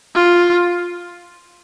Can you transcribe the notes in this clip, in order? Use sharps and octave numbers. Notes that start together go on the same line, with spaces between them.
F4